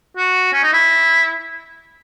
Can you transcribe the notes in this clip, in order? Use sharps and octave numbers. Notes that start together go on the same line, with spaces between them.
F#4
C#4
D#4
E4